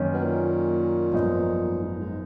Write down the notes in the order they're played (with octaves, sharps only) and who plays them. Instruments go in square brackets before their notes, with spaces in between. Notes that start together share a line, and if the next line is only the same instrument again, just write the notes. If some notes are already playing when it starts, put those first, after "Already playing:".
Already playing: [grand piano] F#2 D#3 A#3 C#4
[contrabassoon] B2
A#2
[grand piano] G#1 F#2 F3 B3 D#4
[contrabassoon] G#2
G#2